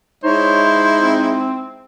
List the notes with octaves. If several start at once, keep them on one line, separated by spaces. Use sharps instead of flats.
G#3 D#4 E4 C5 C#5
C4